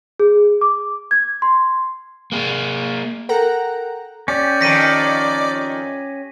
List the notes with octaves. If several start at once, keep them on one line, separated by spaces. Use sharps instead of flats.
G#4
D6
G#6
C6
A#3 G#4
A4 A#4 F#5 G5 A#5 F#6
C#4 G4 D5
F2 D#3 A#6 B6 D#7